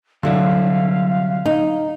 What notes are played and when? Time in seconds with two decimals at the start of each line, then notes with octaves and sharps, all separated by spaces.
0.23 C2 D3 F#3 E4 F5
1.46 D#4